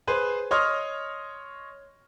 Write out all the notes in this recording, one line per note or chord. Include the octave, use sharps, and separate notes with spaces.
G#4 B4 C5
C#5 D#5 C6 D#6 F6